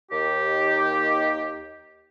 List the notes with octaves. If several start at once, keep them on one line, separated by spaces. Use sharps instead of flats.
D#2 D#3 G4